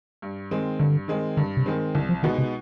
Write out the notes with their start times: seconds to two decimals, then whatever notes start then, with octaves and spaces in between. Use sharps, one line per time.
0.22 G2
0.51 D#3 G#3 C4
0.79 G2 D3
1.08 D#3 G#3 C4
1.37 G2 D3
1.57 C3
1.66 D#3 G#3 C4
1.95 C2 D3
2.09 F3
2.23 B2 D#3 G#3 B3 D#4
2.38 C3